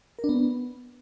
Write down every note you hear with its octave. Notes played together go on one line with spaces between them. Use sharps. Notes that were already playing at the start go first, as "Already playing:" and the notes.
A#4
D4
B3